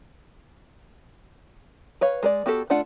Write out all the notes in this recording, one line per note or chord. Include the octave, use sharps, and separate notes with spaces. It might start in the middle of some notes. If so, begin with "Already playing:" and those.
B4 C#5 F5
G#3 A#4 D5
B3 F#4 G4 A4
A3 D4 F4 F#5